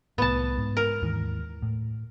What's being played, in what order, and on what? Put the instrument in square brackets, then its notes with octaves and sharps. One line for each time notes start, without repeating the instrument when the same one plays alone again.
[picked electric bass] C2 A2 [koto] B3 A5
[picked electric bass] G#2
[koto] A#4
[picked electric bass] D#2 G#2 E3
A2